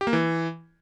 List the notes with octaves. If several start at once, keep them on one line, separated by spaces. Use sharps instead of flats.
G4
A#3
E3